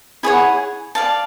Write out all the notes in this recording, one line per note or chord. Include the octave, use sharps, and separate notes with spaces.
E4 G#4 C#5 F#5
D5 F5 A5